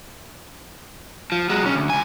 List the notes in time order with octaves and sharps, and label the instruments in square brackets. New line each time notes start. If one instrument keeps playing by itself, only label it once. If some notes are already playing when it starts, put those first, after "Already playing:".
[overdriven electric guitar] F3
F#3 G#3
B1 C#4
D2
C#2 G#5